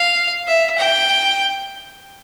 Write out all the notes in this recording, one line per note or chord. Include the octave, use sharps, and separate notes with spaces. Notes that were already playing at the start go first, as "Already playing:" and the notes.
Already playing: F5
E5
G5